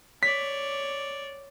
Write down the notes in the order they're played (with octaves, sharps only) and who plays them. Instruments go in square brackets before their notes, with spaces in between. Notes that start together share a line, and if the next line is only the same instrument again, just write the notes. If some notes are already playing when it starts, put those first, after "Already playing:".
[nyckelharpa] C#5 D5 [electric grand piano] B6